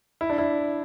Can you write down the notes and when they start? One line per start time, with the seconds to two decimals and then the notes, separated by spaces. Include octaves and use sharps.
0.21 E4
0.30 D4
0.38 E4